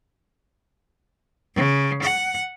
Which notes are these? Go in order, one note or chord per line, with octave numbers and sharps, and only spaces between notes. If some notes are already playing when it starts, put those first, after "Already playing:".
C#3
F#5